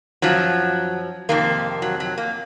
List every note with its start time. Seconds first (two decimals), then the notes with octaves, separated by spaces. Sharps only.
0.22 F#2 F3 F#3
1.29 F2 C3 D#3 A#3
1.82 F#3
2.00 F#3
2.18 A#3